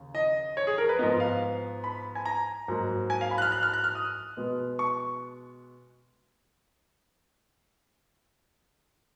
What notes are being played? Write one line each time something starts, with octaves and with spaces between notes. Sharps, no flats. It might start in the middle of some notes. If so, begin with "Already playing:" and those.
Already playing: D#2 C#3
D#5
C#5
G#4
A#4
B4
G#2 F3 B3 D#5
F5
B5
G#5
A#5
G#2 F#3 A#3
G#5
F5
B5
F#6
F6
F#6
F6
F#6
F6
D#6
B2 G#3 B3
C#6